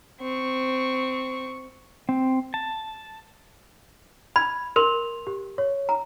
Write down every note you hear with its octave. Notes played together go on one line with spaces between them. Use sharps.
C4 C#6
C4
A5
B5 G#6
A#4 C6 F7
G4
C#5
A#5